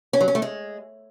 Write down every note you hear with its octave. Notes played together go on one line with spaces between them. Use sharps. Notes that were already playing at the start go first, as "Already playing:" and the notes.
C#4
F#3
C#4
A3
G#3